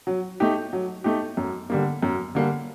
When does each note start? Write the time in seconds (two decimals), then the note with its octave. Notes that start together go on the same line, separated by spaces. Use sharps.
0.07 F#3
0.40 A3 D#4 G4
0.73 F#3
1.04 A3 D#4 G4
1.37 F#2
1.70 D3 G3 A#3
2.03 F#2
2.35 D3 G3 A#3